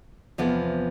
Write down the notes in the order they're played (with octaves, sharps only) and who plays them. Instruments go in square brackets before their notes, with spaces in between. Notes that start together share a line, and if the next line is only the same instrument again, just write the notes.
[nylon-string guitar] E2 C3 F3 B3